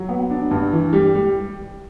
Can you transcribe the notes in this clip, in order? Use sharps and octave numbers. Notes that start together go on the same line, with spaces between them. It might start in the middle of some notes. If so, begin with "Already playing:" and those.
Already playing: F#3
B3
D4
G2
E3
G3
G3